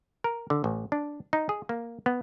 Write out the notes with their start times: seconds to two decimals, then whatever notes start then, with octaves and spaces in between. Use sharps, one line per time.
0.24 A#4
0.50 D3
0.64 A1
0.92 D4
1.33 D#4
1.49 G#4
1.69 A#3
2.06 B3